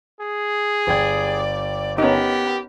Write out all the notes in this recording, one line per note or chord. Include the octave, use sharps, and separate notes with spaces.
G#4
G1 D5 G5 G#6
B3 C#4 D#4 G4 A#4